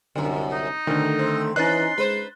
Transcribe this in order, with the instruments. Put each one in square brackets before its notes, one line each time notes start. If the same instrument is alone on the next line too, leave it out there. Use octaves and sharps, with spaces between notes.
[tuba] C2 [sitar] F#2 D3
[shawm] D#4
[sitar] B2 [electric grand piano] D3 D#3 [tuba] A3
[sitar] C4
[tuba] E3 [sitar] C#4 D#4 [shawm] C6 [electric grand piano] F#6 A6
[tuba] G#3 [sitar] B4 C5